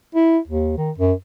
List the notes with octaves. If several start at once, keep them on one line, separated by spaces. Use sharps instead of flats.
E4
D#2
D#3
F#2